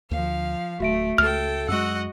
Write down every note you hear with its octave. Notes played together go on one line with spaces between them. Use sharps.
D2 F3 F5
D1 A3 F#4 E5 D7
C#2 A4 G5 F6
F#2 G#3 F#4 D#5 F#5 E6